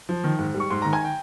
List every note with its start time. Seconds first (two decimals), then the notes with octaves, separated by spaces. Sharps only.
0.09 F3
0.24 D#3
0.39 G#2
0.54 G3
0.60 C#6
0.70 G#2 C6
0.82 D#3 A#5
0.93 G#5
1.05 G5